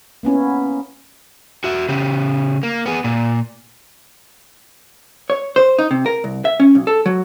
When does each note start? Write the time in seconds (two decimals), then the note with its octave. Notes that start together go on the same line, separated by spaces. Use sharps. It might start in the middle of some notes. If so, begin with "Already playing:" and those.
0.23 A#3 B3 C#4 E4
1.64 F#4 E5
1.89 C#3 G4
2.63 A#3
2.86 B3 G#4
3.04 A#2
5.30 C#5
5.56 C5
5.79 D#4
5.91 C3
6.06 A#4
6.24 C2
6.45 E5
6.60 C#4
6.75 B1
6.87 A4
7.06 F#3